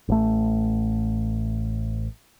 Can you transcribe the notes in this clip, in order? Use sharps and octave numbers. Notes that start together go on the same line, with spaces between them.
A1 A3